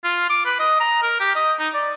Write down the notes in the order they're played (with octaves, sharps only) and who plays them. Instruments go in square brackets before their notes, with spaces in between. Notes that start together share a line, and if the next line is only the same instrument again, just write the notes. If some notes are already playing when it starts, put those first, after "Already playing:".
[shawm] F4
D6
B4
D#5
A#5
A#4
G4
D#5
D#4
D5